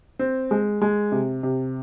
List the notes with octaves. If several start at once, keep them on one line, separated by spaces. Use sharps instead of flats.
C4
G#3
G#3
C3
C3